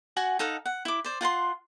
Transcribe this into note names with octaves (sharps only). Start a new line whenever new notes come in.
F#4 F#5 G#5
D#4 A4 F5 F#5
F#5
E4 D6
C5 D5
F4 F#5 A#5 C6